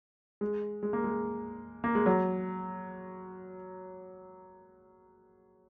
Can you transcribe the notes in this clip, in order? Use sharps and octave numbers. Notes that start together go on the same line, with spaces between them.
G#3
G#3
A#3
G#3
A#3
G#3
F#3